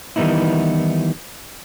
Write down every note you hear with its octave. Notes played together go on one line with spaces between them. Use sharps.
D#3 E3 G3 B3 D#4 E4